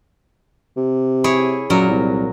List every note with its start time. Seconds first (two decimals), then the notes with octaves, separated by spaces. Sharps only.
0.77 C3
1.24 E4 G#4 C#5
1.70 F#2 A#2 F#3 A#4
1.90 C2